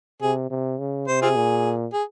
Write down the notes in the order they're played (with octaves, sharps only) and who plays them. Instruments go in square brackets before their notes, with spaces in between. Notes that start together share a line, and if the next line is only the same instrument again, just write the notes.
[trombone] C3 [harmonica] G#4
[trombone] C3
C#3
[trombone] C3 [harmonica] C5
[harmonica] C4 F4 G#4
[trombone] A#2
[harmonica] G#4